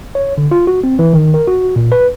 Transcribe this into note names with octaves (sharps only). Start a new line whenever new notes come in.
C#5
D3
F4
F#4
C4
E3
D#3
A#4
F#4
A#2
B4